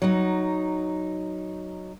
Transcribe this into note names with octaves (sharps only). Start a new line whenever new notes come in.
F#3 D#4